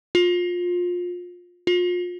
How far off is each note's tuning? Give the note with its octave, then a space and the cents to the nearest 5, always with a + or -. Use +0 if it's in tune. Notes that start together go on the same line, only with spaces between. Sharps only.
F4 +25
F4 +35